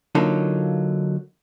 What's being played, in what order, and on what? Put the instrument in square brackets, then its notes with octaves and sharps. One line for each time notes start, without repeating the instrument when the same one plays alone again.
[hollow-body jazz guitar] D3 F#3 A#3 D#4 F4 A4